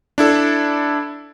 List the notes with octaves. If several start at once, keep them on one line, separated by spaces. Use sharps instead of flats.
D4 E4 A4